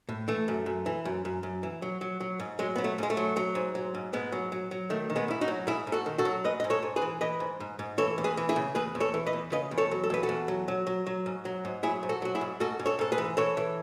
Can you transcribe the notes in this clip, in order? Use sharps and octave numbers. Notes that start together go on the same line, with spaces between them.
A2
E3 A3
F#2
F#2
E3
F#2
F#2
F#2
E3
F#3
F#3
F#3
G#2
F#3 G#3
F#3 B3
A3
G#2 G#3
A3
F#3
F#3
G#2
F#3
G#2
G#2 G#3 B3
F#3
F#3
F#3
D#3 A3
D#3
G#3 B3
G#2 E4
D#4 F#4
F#3
G#2 E4 G#4
G#2
F#4 A4
D#3
F#4 A4
F#3
G#2 B4 D#5
G#2 D#5
A4 C#5
G#2
G#4 B4
E3
E3 B4 D#5
G#2
G#2
G#2
E3 A4 C#5
E2
G#4 B4
E3
E4 G#4
C#3
E2 G#4 B4
E2
A4 C#5
E3
B4 D#5
E2
C#3 B4 D#5
E2
A4 C#5
F#3
A4
E2 B4
F#4 A4
E2
F#3
F#3
F#3
F#3
G#2
F#3
G#2
F#3 E4 G#4
G#2
F#4 A4
F#3 F#4
E4 G#4
G#2
G#2 F#4 A4
G#2
A4 C#5
G#2 A4
G#4 B4
E3
E3 A4 C#5
E3